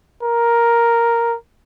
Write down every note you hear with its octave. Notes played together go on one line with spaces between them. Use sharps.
A#4